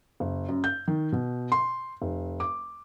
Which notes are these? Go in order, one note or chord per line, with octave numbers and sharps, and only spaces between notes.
F#1
F#2
G6
D#3
B2
C6
F1
D6